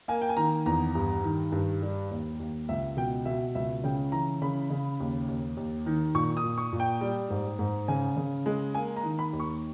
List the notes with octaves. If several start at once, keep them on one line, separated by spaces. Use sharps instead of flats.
A#3 G#5
G5
G#5
D#3 A#5
E2 A#5
G2
D#3
G2
G3
D#2
D#2
C#2 E5
B2 G5
B2 E5
C#2 E5
C#3 G5
E3 A#5
C#3 B5
C#3
D#2
D#2
D#2
D#3
A#2 C#6
D#6
A#2
C#6
A#2
G5
G3
G#2
G#2
C#3 G#5
C#3
G#3
A#3 G#5
A#5
D#3
B5
D#2
C#6